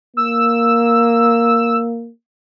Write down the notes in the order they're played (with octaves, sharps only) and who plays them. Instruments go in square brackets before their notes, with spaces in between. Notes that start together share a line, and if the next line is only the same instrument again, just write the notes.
[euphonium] A#3 [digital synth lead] E6